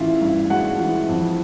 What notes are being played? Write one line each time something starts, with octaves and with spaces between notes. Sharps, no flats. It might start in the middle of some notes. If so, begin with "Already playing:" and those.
Already playing: A1 E3 G#3 E4 F4 E5 F5
G2
G#3 F#4 F#5
E3
F2